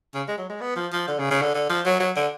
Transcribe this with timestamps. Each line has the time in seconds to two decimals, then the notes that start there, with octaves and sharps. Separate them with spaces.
0.15 C#3
0.28 G#3
0.38 F#3
0.50 G#3
0.61 B3
0.76 F3
0.93 F3
1.08 D3
1.19 C#3
1.31 C#3
1.42 D3
1.55 D3
1.70 F3
1.86 F#3
2.00 F#3
2.16 D3